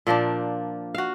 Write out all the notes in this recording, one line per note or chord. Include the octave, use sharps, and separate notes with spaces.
A#2 F3 A#3 D4
F#4 F5